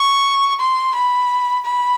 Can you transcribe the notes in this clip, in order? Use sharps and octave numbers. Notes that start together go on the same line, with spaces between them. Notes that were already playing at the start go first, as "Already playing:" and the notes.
Already playing: C#6
C6
B5
B5